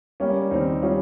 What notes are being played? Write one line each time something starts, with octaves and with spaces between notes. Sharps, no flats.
G3 A#3 C#4
D#2 C4 D#4
G3 C#4 F4